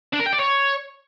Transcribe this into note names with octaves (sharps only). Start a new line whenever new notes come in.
D4
A#4
G5
D5
C#5